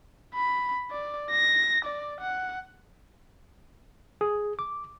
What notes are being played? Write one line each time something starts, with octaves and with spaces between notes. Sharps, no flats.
B5
D5
A#6
D5
F#5
G#4
D6